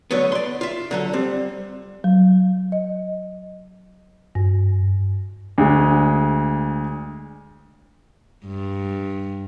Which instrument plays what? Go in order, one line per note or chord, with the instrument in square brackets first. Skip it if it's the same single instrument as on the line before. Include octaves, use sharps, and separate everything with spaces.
[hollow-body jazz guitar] D3 F#3 A3 B3
D5 C6
F4 E5
D3 F#3 A4
G3 C4
[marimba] F#3
D#5
G2
[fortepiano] D2 G#3
[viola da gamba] G2